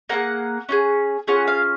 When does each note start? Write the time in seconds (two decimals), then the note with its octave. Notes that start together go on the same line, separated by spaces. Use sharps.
0.09 A#3 F4 G#4 F#5
0.69 C#4 F4 G#4
1.27 C#4 F4 G#4 F#5
1.47 F5